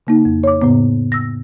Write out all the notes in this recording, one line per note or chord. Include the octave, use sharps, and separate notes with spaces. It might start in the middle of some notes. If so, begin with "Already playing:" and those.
C#3 A#3 D#4
F2
C#5 D6
A2 C#3 B3
E6 A#6